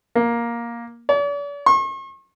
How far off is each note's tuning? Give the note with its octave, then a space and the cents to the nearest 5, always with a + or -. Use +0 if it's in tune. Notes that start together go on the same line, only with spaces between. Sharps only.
A#3 +10
D5 -45
C#6 -45